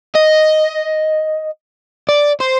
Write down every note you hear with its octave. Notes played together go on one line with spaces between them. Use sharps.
D#5
D5
C5